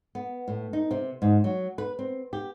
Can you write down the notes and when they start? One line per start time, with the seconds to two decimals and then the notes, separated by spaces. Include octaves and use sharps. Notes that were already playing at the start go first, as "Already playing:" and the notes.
0.15 B3
0.48 A2
0.73 D#4
0.91 C3
1.22 G#2
1.44 F#3
1.78 B4
1.99 C4
2.33 G4